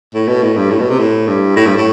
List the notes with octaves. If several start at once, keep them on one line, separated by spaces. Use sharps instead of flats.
A2
B2
A2
G2
A2
B2
C3
A2
G2
A2
G2
A2